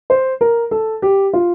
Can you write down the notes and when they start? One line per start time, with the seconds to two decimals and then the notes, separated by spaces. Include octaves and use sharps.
0.10 C5
0.41 A#4
0.71 A4
1.02 G4
1.33 F4